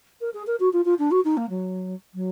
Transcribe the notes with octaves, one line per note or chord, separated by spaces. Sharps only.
A#4
G#4
A#4
F#4
F4
F4
D4
F#4
D#4
A#3
F#3
F#3